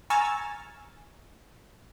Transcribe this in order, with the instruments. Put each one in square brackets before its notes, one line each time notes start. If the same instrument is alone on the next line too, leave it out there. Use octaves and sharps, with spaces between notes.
[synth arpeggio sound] G#5 A#5 C#6 E6 F6 A6